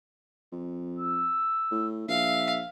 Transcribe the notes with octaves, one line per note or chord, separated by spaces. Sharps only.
F2
E6
A2
A#1 E5 F5